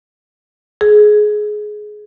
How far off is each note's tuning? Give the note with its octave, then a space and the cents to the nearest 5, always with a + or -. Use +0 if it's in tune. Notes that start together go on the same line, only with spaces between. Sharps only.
G#4 +15